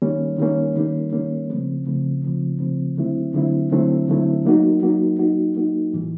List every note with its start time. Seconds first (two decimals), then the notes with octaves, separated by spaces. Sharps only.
0.02 D#3 G3 A#3 C#4
0.38 D#3 G3 A#3 C#4
0.76 D#3 G3 A#3 C#4
1.13 D#3 G3 A#3 C#4
1.50 C#3 F3 A3 C4
1.86 C#3 F3 A3 C4
2.24 C#3 F3 A3 C4
2.60 C#3 F3 A3 C4
2.97 D3 F#3 A3 C4 E4
3.34 D3 F#3 A3 C4 E4
3.72 D3 F#3 A3 C4 E4
4.08 D3 F#3 A3 C4 E4
4.45 F#3 A#3 D#4 F#4
4.82 F#3 A#3 D#4 F#4
5.19 F#3 A#3 D#4 F#4
5.56 F#3 A#3 D#4 F#4
5.93 A2 E3 G3